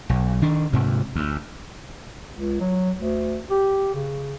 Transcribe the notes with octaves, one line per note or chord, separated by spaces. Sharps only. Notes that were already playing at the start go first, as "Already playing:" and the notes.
B1
D#3 D4
D2 G#2 C3
D2
C#2
F#3
D2
G4
C#3